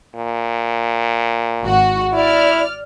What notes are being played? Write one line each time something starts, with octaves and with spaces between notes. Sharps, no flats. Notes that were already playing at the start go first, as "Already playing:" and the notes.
A#2
G#1 F#4
E4 D5 F6